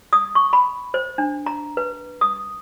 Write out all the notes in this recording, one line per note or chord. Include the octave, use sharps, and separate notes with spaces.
D#6
C#6
B5
C5
D4
A#5
B4
D#6